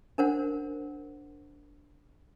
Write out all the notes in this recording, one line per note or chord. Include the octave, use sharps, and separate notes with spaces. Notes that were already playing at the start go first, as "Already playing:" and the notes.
D4 A#4 C5 F#5